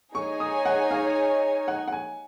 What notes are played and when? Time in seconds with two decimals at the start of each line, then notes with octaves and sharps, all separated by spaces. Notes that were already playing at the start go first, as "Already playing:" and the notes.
0.15 D#4 G#4 C#5 G#5 C#6
0.40 D#6
0.65 F#5
0.91 F5
1.68 F#5
1.87 F#5
1.93 G#5